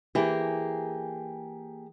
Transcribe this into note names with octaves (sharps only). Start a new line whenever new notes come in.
E3 A#3 G4 G#4